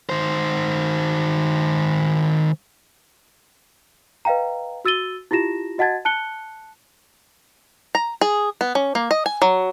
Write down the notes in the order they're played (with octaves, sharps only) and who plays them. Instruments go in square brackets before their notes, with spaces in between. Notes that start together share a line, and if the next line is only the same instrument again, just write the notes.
[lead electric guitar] D#3 C5
[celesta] B4 D#5 F5 G5 A#5
F#4 E6 A6 D#7 G7
E4 F4 G4 A#6 E7
F#4 D#5 F#5 A5 G#6 A6
A5 F#6 C#7 G7
[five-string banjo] A#5
G#4
B3
C#4
A#3
D#5
G#5
F#3